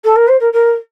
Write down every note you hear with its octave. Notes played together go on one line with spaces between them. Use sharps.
A4
A#4
C5
A#4
A#4